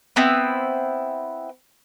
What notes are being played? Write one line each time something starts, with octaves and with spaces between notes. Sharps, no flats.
B3 C4 E4